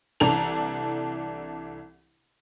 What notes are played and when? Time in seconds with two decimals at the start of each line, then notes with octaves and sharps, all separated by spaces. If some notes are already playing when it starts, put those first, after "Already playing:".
0.20 C2 E3 D4 A4 A#5 F7